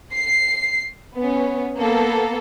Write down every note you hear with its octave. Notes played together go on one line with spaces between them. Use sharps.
C7
B3 C#4
A#3 B3 A4